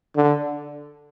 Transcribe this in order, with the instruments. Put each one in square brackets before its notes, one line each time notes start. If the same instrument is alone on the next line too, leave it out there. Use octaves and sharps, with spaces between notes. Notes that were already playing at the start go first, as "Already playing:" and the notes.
[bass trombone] D3